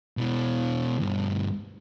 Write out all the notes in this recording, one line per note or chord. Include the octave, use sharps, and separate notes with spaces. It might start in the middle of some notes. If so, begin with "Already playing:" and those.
B2 E4
D2 G2